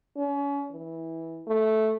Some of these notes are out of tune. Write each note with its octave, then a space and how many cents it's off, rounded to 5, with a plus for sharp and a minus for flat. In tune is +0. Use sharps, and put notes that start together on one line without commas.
C#4 +35
E3 -10
A3 -10